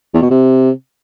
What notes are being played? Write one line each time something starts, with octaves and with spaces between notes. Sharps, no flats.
E2
B2
C3